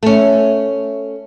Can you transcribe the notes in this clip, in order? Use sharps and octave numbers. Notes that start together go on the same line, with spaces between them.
A3 C#4